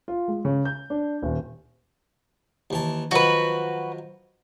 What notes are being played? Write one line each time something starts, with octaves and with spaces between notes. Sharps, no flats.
F4
G#3
C#3
G6
D4
D#1
D#2 E3 A5
D#3 F3 F#3 F#4 B4